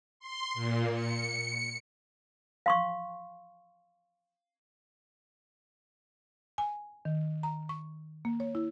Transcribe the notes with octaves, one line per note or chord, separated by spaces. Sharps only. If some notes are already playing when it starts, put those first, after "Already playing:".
C6
A#2
C#7
F5 C6 C#6
G#5
D#3
A#5
C#6
A#3
C#5
E4